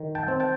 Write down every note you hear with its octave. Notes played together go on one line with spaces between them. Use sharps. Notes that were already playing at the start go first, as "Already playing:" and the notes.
Already playing: D#3
G5 A5
C4
G5 A5